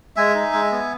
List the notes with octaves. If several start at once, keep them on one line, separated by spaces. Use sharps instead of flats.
G#3 E5 G#5
D#4
G#3
B3